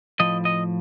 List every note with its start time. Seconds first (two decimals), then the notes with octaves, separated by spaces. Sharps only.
0.20 A2 F3 D#5
0.45 D#5